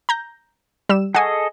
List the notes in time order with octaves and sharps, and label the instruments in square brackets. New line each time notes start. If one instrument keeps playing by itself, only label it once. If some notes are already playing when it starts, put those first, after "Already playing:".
[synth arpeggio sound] A#5 G6 A#6
G3 E6 E7
[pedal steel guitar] G#4 A4 D#5 [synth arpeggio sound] F#5 G#5 C#6